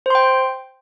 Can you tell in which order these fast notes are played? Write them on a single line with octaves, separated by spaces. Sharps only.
C5 C6 G5